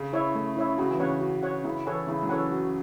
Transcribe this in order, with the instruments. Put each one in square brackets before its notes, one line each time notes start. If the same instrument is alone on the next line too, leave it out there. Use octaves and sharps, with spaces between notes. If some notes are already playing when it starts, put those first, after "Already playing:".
Already playing: [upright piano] C#3
[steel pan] E4 C#5 E5
A3
E4 C#5 E5
[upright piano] C#3 [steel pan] F#4
[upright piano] E3
[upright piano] C#3 [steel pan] C#5 F#5
[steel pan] F#4
C#5 F#5
[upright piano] C#3 [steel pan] E4
[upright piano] E3 [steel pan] A4 C#5 F#5
[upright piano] C#3 [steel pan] E4
[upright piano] F#3
[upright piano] E3 [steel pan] A4 C#5 F#5
[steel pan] F#4